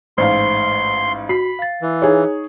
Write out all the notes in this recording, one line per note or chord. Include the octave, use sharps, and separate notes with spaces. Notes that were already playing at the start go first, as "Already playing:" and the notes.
A1 G#2 C5 F5 C6
F#4 B5 C7
F5 A6
E3
D#4 G#4 C#5